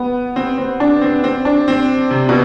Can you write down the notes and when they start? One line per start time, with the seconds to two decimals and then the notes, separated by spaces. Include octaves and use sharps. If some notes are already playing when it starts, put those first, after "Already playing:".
Already playing: B3
0.36 C4
0.58 C4
0.80 D4
1.01 C4
1.24 C4
1.45 D4
1.68 C4
2.11 C3
2.29 B2